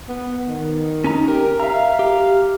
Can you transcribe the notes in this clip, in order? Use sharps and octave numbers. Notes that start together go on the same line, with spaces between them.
B3
D#3
C#4 D#4 A#5
G4 A#4
E5 F5 A#5
G4